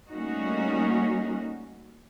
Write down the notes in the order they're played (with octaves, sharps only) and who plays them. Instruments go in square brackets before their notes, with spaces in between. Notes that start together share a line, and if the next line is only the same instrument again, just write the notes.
[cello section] G3 A3 A#3 C#4 D#4 F#4